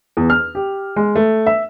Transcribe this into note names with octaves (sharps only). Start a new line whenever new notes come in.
E2
F6
G4
G#3
A3
E5